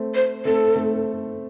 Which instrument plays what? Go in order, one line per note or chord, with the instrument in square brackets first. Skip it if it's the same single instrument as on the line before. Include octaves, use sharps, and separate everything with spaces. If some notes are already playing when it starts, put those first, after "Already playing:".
Already playing: [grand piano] A3 C4
[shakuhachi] C5
[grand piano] A3 C4 [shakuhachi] A4
[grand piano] A3 C4